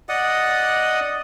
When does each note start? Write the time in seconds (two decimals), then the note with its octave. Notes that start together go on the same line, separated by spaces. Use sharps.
0.09 D5 D#5 F#5 D#6